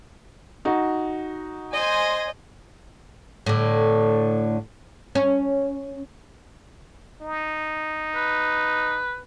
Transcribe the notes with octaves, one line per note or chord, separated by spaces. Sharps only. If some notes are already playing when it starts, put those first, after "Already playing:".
D#4 F#4
C5 D#5 G#5 C6
A2 D3
C#4
D#4
B4